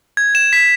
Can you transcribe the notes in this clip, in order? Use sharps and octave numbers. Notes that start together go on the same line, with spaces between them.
G#6
E7
B6